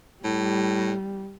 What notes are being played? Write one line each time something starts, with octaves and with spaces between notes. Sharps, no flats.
A2 G3